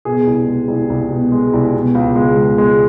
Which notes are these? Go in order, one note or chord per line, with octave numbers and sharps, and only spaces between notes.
B2 G#4
C2
G#3
C2
C2
B2
G#3
C2
B2
C#2
G#3
C#2
G#3